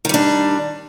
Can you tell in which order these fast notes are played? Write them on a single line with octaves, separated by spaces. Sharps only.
D#3 G3 D4